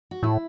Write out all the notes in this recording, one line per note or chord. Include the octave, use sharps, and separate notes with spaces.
F#4
A2 E4